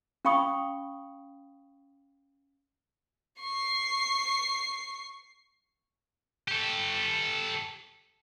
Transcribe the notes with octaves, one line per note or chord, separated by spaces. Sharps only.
C#4 F5 G5 B5 C#6 D#6
C#6 C7
G4 A4